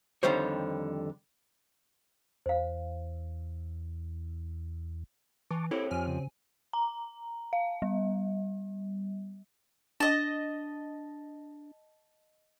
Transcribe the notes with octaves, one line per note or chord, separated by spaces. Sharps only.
F2 D3 D#3 G3 C5 C#5
E2 C5 F5
E3 A5 C#6 D6
C4 E4 G4 A4 C#5
F2 G#5 F6
C#3
A#5
F5
G3
D4 D#5 A5